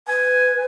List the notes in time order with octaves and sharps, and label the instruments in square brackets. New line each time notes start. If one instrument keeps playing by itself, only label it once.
[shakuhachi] B4 [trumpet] G#5